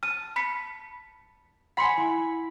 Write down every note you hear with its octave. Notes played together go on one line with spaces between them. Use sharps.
A5 F6 D#7
B5 B6 C#7
F#5 G#5 B5 C6 C#7
E4